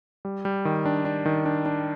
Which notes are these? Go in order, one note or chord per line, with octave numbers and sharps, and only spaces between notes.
G3
G3
D#3
D4
D4
D#3
D4
D4